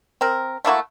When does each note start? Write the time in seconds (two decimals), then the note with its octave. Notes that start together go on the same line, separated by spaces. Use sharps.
0.21 C4 A#4
0.65 A3 A#3 E4 F#4